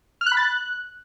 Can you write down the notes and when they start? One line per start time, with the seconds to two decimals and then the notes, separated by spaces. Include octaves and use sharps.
0.21 F6
0.26 F#6
0.32 B5
0.37 A6
0.42 F#6